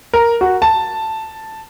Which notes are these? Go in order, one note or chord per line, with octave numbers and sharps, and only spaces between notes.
A#4
F#4
A5